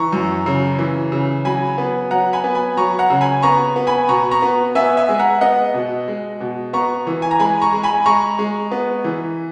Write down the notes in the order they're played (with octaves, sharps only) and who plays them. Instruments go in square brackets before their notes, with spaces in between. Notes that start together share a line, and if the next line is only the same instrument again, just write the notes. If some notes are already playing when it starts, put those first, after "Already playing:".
Already playing: [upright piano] E3 A#5 C#6
F#2
C#3
E3
C#3
F#3 G#5 B5
B3
F#3 F#5 A#5
G#5 B5
B3
G#5 B5
F#3 A#5 C#6
F#5 A#5
C#3
G#5 B5
B3 A#5 C#6
B3
G#5 B5
B2 A#5 C#6
A#5 C#6
B3
B3 E5 G#5
E5 G#5
G#3
F#5 A#5
B3 D#5 F#5
B2
G#3
B2
B3 A#5 C#6
E3
G#5
A#5
G#3 G#5 B5
A#5 C#6
G#3
G#5 B5
G#3 A#5 C#6
G#3
B3
E3